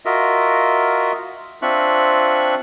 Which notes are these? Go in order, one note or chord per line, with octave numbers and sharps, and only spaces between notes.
F4 F#4 A#4 D#5 E5
C4 D4 F4 E5 C#6 F#6